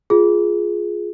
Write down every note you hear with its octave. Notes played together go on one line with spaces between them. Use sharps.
F4 G#4